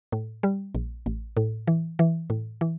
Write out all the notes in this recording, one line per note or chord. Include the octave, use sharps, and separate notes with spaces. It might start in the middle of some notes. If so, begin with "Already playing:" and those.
A2
G3
A#1
A1
A2
E3
E3
A2
E3